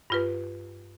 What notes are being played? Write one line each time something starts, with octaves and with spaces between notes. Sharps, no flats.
G2 F4 B4